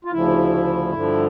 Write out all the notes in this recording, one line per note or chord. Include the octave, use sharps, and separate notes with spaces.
F4
D2 C#3 F3 E4
G2 D3 F3